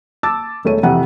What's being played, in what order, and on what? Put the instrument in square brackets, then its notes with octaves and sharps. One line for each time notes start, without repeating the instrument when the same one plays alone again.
[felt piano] A5 D6 E6 A6
E1 A3 A4 C#5 D#7
F2 C3 E3 F#5